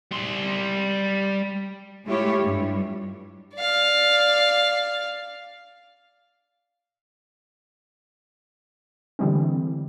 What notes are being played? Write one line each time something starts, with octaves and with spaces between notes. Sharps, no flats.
G3 C6
G#3 A3 E4 F4 G4 C#5
G2 G3
D5 F5
D3 E3 G3 G#3 C4